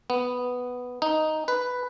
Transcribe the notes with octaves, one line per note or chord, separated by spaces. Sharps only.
B3
D#4
B4